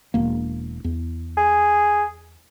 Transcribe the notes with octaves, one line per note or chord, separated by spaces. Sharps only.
E1 A#3
E2
G#4